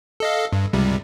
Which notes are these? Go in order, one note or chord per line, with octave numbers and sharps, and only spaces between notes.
A4 D#5 F5
G2
C#2 C3 G3